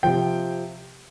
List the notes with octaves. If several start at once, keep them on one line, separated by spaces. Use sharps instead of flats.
C3 F3 G5